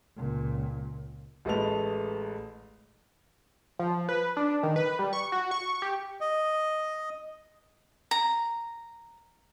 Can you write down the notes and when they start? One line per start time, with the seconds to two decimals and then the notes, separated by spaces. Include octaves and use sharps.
0.16 C#2 A#2
1.45 A1 G#3 A3 B4 A5 F7
3.79 F3
4.09 B4
4.37 D4
4.63 D#3
4.76 B4
4.99 G3
5.13 C#6
5.32 F#4
5.51 C#6
5.82 G4
6.21 D#5
8.11 A#5